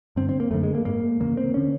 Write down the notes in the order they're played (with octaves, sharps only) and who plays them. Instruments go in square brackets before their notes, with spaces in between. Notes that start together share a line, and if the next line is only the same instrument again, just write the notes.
[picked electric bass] G2 D3 C4
C4
A#3
F#2 D3 A3
G#3
A#3
G#2 A#3
E2 C#3 A#3
C4
D3 C#4